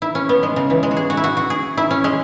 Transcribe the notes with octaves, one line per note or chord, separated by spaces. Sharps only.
E4
C#4
B3
G#3
C#3
E3
G#3
F#4
G#4
F#4
E4
F#4
F#4
G#4
E4
C#4
G#3